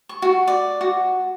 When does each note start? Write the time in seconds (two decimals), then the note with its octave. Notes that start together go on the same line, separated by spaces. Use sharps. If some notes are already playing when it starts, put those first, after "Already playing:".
0.09 C#6
0.22 F#4
0.47 D5
0.81 F#4